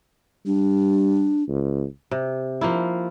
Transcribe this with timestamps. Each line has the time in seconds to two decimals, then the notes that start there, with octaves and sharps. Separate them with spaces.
0.46 G3 D4
1.49 C#2
2.11 C3
2.61 F3 A#3 E4